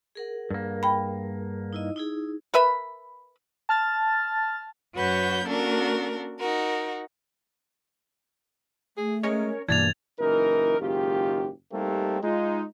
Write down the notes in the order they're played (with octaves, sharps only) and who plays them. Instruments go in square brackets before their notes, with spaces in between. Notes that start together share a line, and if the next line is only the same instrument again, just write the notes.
[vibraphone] G#4 A#4 F#5
[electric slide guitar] G2 A#3
[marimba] G5 B5
[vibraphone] D#4 E4 D#5
D#4 E4 G#4
[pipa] A#4 B4 E5 B5
[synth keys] A5 F6 A6
[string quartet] F#2 F#4 B4 C#5 F#5 G6
A#3 C#4 D4 F#4 A4 A#4
D#4 F#4 A#4
[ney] A3 [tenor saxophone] G#4
[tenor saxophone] G#3 [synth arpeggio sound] C#4 A#4 C#5
[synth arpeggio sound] G2 B2 E3 [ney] A#3 [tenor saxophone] D4 [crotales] G#6 A6 F7
[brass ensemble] F#1 E3 D#4 A#4
F#1 G#2 D#3 F4 G4
G3 A3 A#3 C4 D#4 G4
G#3 D#4 F4